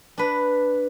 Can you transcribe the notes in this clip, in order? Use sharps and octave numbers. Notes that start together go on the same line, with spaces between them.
D4 B4